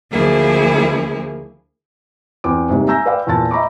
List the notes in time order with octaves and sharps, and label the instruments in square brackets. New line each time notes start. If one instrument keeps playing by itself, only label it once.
[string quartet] D2 F3 A#3 E4 G#4
[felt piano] E2 C4 D6
G#2 C3 G3 A#3
E5 G#5 A#5 E6 G6 A#6
B4 D5 F5 G5
E2 A#2 F4 A5 A6
D#5 E5 A#5 B5 C#6 D6